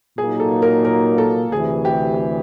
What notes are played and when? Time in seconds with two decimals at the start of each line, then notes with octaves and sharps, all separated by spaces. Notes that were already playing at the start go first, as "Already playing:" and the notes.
0.17 A#2 F#3 A#3 D#4 G#4
0.40 A4
0.62 A#4
0.85 A#4
1.18 A4
1.52 D2 C3 E3 G#4
1.85 G4